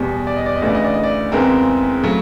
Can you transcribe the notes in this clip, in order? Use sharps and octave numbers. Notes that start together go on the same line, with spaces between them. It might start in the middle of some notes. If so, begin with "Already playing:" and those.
Already playing: E2 B2 G3
D5
D#5
D5
D#5
D2 C#3 E3 D5
D#5
D5
D#5
D5
E2 C#3 E3 G#3 C4 A#4
C#3 F#3 A3